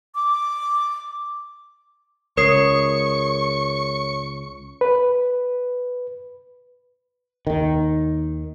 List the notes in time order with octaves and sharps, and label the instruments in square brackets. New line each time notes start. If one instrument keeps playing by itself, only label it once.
[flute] D6
[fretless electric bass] C#2 [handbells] A#4 D#6 C7 [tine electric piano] C#5 [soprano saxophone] C#6
[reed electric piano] B4
[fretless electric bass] D#2 D#3